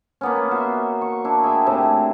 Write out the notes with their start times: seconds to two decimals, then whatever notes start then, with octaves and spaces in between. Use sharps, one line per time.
0.21 A#3 B3 C#4
0.51 F#4 C5 E5
1.01 C#6
1.25 D4 E4
1.44 G#4 E5 G5
1.66 A2 C3